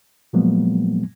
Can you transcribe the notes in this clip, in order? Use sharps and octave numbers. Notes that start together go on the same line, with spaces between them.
A#2 F3 F#3 G#3 A#3 B3